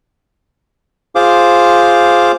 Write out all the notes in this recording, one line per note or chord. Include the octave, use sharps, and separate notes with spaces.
F4 G#4 C5 F5 D6